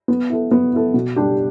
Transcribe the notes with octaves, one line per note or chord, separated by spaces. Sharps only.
B3
E4 A4
B3
E4 A4
B2
G3 D4 G4